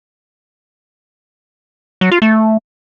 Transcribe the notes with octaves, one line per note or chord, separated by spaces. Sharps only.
F#3
F4
A3